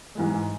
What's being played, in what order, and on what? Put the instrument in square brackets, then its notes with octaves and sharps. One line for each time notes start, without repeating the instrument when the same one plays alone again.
[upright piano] G#2 E3 G#3